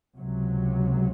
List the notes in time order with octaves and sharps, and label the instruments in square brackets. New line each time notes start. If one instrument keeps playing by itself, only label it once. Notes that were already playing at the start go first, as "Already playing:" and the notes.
[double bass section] C#2 C3 F#3